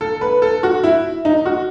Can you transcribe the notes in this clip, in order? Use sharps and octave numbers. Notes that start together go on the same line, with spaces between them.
A4
B4
A4
F#4
E4
D#4
F#4